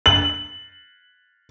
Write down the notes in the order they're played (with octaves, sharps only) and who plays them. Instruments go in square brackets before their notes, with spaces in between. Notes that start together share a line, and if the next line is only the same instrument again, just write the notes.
[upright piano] F#7